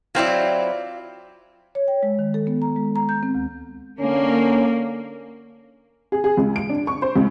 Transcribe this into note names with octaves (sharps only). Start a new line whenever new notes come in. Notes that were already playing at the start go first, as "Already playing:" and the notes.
F#3 C4 E4 F4 D5
C#5
G5
G#3
D#3
A4
B3
A#5
G#3
A#5
G6
C4
D2
D3 A#3 C#4
G#4
G#4
C#2
D7
D4
C#6
C5
C#2